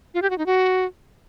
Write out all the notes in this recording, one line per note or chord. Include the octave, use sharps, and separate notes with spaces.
F4
G4
F#4
D#4
F#4